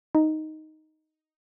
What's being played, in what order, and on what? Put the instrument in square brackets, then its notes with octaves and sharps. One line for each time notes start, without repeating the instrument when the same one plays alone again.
[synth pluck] D#4